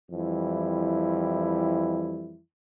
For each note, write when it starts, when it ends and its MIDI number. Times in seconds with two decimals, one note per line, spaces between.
0.11 2.39 41
0.11 2.39 52
0.11 2.39 55
0.11 2.39 64